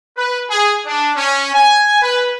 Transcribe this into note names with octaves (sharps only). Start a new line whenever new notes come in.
B4
G#4
D4
C#4
G#5
B4